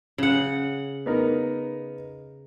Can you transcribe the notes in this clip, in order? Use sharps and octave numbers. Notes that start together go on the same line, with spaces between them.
C#3 F#5
B3 D#4 A#4